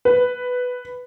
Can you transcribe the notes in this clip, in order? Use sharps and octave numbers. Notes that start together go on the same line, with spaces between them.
B4